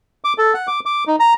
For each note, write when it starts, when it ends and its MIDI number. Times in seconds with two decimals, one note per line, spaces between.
0.25 0.33 86
0.38 0.54 69
0.54 0.67 78
0.67 0.80 86
0.86 1.04 86
1.07 1.16 63
1.20 1.34 82